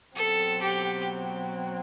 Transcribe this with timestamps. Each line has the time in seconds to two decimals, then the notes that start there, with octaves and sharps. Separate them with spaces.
0.16 B2 F#3 C4 A4
0.62 G4